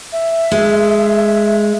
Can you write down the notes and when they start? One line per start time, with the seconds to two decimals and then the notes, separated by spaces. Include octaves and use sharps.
0.12 E5
0.51 G#3